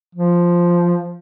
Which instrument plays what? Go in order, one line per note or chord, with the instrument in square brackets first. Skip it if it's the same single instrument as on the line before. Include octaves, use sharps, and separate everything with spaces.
[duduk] F3